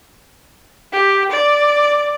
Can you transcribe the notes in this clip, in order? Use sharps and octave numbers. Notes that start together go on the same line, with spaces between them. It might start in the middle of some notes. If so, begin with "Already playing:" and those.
G4
D5